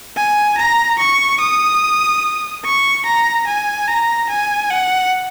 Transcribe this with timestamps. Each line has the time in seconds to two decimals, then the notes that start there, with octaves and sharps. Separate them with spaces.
0.17 G#5
0.58 A#5
0.99 C#6
1.40 D#6
2.64 C#6
3.06 A#5
3.47 G#5
3.88 A#5
4.30 G#5
4.71 F#5